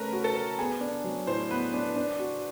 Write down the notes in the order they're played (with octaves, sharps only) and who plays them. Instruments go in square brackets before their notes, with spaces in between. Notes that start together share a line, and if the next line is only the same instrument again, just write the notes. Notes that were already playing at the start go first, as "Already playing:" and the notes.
Already playing: [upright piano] A3 C#4 [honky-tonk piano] A#4 B4
[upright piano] F#4
[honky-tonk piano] A4
[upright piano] A#4
[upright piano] B3 [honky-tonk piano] G#4
[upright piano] D4
F#3
[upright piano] A2 [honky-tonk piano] C5
[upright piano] B3 [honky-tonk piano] B4
[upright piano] D4
D4
F#4